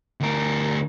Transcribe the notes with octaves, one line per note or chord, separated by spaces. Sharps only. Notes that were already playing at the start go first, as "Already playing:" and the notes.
D2 A#4